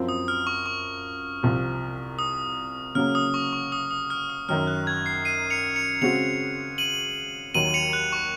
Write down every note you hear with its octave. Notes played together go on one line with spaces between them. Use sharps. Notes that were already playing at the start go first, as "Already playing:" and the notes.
Already playing: F#2 F3 C4
D#6
F6
C#6
C#6
C2 C3 F3 C4
D#6
C#3 F#3 A#3 F6
D#6
C#6
C#6
D#6
D#6
F6
D#6
F#2 D#3 F#3 F6
F#6
G#6
C7
C7 D#7
C#7 F7
C#7 F7
C#3 G#3 C4 F#4 C#7 F7
D#7 F#7
D#2 D#3 F#3 D#7 F#7
C#7 F7
F#6
C#6